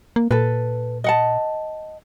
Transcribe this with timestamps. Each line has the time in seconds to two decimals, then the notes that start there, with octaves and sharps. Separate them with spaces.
0.16 A#3
0.31 A#2 A4 B4
1.04 D#5 F#5 A5